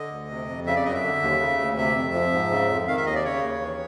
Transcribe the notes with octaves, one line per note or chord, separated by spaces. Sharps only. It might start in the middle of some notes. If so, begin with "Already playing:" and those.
Already playing: D3 D#5
D2
C3
F2
C#3 E5
D5
F#2 D#5
E5
D3
D#2
C#3
D2
C3 E5
F2
F3
G#2
C#3
F2
D#3 F5
E5
D#2 D#5
D5
C#3 C#5
D#2
E3